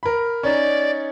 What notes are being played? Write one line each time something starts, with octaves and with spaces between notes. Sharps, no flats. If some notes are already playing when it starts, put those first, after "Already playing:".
A#4 B5
C#4 D#4 D5